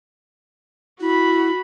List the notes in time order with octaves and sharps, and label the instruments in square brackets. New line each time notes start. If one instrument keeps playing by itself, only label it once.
[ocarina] E4 [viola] F#4 B5